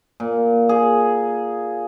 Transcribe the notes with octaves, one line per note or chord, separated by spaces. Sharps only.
A#2
G#4